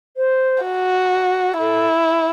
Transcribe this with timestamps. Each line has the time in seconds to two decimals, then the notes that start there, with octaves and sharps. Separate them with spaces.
0.17 C5
0.63 F#4
1.59 E4 A4